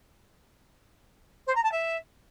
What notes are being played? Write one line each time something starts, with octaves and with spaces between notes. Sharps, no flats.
C5
A#5
A5
E5